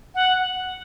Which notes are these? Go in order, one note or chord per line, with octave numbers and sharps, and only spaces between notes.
F#5